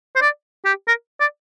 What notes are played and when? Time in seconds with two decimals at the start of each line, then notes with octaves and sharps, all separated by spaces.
0.16 C5
0.22 D5
0.65 G4
0.88 A#4
1.20 D5